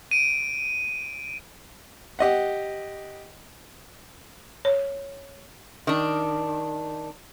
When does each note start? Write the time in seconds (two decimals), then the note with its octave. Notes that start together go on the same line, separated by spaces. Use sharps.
0.11 D7 D#7
2.19 G4 D#5 F#5
4.65 C#5
5.87 D#3 D4